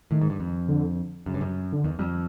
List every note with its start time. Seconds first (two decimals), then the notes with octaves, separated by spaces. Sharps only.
0.11 A2 D#3
0.22 G#2
0.30 G2
0.40 F2
0.69 D3
1.26 F#2 C#3
1.34 G2
1.41 F#2
1.73 D3
1.84 E2 D#3
1.99 F2 G3